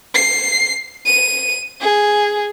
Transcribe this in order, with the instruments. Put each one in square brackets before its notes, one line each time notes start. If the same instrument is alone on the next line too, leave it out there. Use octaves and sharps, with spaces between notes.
[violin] C7
D#7
G#4